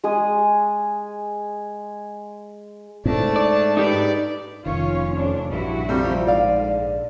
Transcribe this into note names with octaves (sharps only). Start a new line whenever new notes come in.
G#3 G#4 G#5 D#6
G#2 A3 D4 A5
D5
D#4 G4 B4 D5
F1 C2 D#3 C#4 F4 C#5
F2 C#4 D4
A#1 G2 E3 E4 F#4
F2 C3 F3 G3
G#2 D3 D5 F5